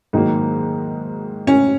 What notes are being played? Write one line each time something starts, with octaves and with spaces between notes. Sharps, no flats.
G#2 D#3 F#3 A#3 D#4
C#4